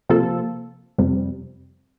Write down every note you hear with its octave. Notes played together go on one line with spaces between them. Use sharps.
C3 F3 A#3 F4 A4
F2 C3 G3